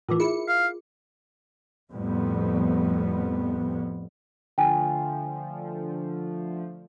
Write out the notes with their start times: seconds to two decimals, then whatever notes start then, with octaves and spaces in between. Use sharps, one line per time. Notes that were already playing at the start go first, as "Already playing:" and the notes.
0.09 A2 E3 F4 A#4 D6
0.20 E4 G#4 C#7
0.48 F5
1.92 F2 A2 G3 B3
4.58 D3 F3 A3 G5 G#5